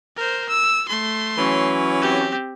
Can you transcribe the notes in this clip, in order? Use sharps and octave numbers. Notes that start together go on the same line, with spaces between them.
A#4 C5
E6
A3 C6
E3 F#3 C#4
C4 G4